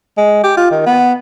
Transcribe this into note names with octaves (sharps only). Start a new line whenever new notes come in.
G#3
G4
F4
D#3
B3